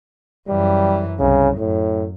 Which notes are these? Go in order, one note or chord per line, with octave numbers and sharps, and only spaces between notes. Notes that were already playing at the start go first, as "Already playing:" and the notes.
F#2 E3 G3
C2 C#3
F#2 A2